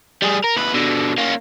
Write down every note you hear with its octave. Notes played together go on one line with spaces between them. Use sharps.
G3 G#4
A#4
D#2 B4
B2 D3
A#3 C#4